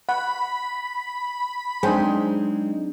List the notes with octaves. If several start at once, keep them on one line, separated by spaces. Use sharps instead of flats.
F#5 B5
F#3 G#3 C4 D4 D#4 G#4 C5 G5